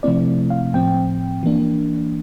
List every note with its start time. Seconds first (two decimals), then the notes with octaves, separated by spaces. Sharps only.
0.03 C3 F3 A3 C4 E4 D5
0.50 F5
0.73 A2 F3 C4 G5
1.43 E3 A#3 D4